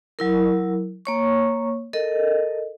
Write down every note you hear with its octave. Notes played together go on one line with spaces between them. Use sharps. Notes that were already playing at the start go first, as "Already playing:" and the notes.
F#3 E4 A#4
A#3 C#5 C#6
A4 A#4 D#5